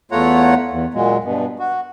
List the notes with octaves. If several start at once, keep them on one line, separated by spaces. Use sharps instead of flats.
E2 A3 F4 C#5 F#5 A#5
E2
A#2 F#3 G#3
G2 B2
F#4